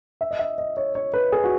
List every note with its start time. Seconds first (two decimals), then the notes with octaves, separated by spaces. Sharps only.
0.21 E5
0.31 D#5
0.39 E5
0.58 D#5
0.77 C#5
0.95 C#5
1.14 B4
1.32 G#4
1.44 F#4